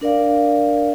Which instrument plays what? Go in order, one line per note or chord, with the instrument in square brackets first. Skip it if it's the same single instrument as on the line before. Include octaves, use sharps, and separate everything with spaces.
[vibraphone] D4 A#4 D5 F5